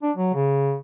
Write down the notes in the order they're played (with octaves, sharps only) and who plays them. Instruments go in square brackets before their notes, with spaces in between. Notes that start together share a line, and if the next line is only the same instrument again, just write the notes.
[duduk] D4
F#3
C#3